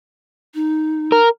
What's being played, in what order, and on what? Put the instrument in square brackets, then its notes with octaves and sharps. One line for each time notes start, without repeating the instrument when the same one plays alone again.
[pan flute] D#4
[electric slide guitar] A#4